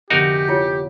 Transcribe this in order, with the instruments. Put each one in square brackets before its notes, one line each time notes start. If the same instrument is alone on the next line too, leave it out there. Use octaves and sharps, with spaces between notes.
[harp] F1 D3 B3 [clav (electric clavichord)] D#4 F#4 A#4 [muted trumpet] G4
[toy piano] E4 F4 C#5 [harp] C#7